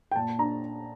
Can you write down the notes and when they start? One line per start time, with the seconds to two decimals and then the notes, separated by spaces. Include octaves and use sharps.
0.11 G5
0.16 A#2 A5
0.39 D4 A#5